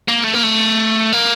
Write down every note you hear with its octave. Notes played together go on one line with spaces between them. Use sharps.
A#3
A3
A#3
A3
A#3